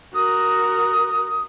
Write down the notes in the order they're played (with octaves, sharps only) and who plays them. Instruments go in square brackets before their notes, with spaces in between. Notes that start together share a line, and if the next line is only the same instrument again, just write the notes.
[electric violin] F#4 A#4 [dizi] D#6